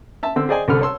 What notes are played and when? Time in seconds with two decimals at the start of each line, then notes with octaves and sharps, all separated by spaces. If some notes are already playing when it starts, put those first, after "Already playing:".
0.23 E5 A5 E6
0.36 D3 C4 E6
0.49 G#4 C5 D5 D#5 G5 G#5
0.68 C2 D3 A4 B5 F6
0.81 C#5 A5 C6 E6